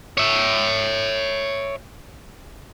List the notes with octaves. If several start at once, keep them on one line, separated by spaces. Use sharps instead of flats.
C#5 E5